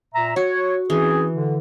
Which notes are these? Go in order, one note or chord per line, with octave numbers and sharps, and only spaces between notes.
A#2 E5 A#5
F#4 C#5
E3 C4 C#4 G#4
D3